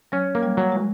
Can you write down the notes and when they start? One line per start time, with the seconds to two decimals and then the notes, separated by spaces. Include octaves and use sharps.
0.12 F#3 C#4
0.35 A#3
0.43 G3
0.57 F#3
0.72 G#3